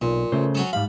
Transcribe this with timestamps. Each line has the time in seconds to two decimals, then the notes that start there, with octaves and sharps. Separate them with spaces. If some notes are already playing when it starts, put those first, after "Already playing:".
0.02 B1 A#2
0.32 C#3 A3 C5
0.55 F#3 C#4 A4
0.73 G#2 G3 F5 B5